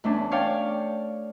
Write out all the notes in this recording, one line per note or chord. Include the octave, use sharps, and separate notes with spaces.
E2 A3 C#4 D4
C#5 D5 F5 G5